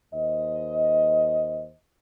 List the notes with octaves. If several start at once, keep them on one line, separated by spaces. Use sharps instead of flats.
D#2 C5 D#5